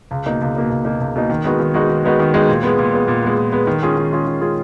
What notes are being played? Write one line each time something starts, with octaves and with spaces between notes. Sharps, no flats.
C#2
B2 A#3 D#4
C#2
B2 A#3 D#4
C#2
B2 A#3 D#4
C#2
B2 A#3 D#4
D#3
G#3 B3 D#4 F#4
D#3
G#3 B3 D#4 F#4
D#3
G#3 B3 D#4 F#4
D#3
G#3 B3 D#4 F#4
A#2
G#3 B3
A#2
G#3 B3
A#2
G#3 B3
A#2
G#3 B3
D#3
G#3 C#4 F4 G#4
D#3
G#3 C#4 F4 G#4
D#3
G#3 C#4 F4 G#4